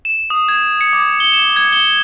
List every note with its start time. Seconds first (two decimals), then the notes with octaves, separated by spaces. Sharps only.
0.05 E7
0.30 D#6
0.49 G#6
0.81 C#7
0.93 D6
1.20 G7
1.33 E7
1.56 G#6
1.73 G7